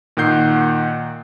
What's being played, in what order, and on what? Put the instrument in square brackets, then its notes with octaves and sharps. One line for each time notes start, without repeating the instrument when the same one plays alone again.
[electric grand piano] A#2 D#3 F#5 G6 C7